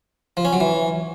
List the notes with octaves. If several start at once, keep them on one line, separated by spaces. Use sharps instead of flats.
F3
C#4
F#3
E3